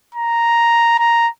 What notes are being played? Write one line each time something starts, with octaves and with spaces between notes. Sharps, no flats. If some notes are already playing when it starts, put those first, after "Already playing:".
A#5
A#5